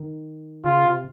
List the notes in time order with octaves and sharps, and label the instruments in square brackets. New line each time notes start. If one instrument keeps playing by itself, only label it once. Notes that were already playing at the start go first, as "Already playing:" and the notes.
Already playing: [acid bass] D#3
[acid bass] C#3 [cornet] F4
[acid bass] C3